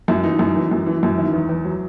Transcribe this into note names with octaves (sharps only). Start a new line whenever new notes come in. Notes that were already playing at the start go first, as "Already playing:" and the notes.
F#2 E4
E3 D#4
F#2
E3
F#2
E3
F#2
D#3 E4
E2
E2
F#3